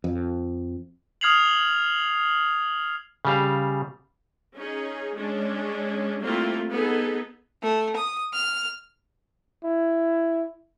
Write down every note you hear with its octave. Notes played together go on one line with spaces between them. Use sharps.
F2
D#6 F6 G#6 C7 F7 F#7
C#3 G3 F5
C#4 D#4 G#4
G#3 C#4 D4
G3 A3 A#3 C4 E4 F4
B3 D#4 G#4 A4
A3
D#6
F6
E4